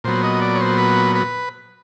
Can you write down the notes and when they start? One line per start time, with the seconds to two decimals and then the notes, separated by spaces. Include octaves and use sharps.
0.04 A#2 F#3 B3 C5
0.23 D#5
0.41 D5
0.56 C#5
0.61 C5
0.78 B4
1.16 B4